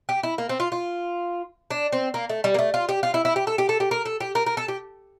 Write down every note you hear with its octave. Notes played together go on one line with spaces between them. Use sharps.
G4
E4
A#3
C4
F4
F4
D4
C4
A#3
A3
G3
A#3
A3
F4
G4
F4
E4
E4
G4
A4
G4
A4
G4
A#4
A4
G4
A#4
A#4
A4
G4